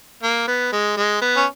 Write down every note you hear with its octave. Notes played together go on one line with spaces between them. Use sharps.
A#3
B3
G#3
G#3
B3
C#4